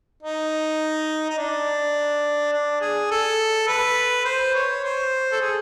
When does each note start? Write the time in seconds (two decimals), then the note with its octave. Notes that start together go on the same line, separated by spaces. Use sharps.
0.22 D#4
1.30 D#4
1.38 D4
2.53 D4
2.81 G#4
3.11 A4
3.68 B4
4.25 C5
4.55 C#5
4.84 C5
5.32 A4
5.41 G#4